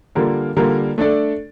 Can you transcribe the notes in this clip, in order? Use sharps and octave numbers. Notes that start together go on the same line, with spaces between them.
D3 G3 A#3 F4 A#4
D3 G3 A#3 F4 A#4
A3 D4 A4 D5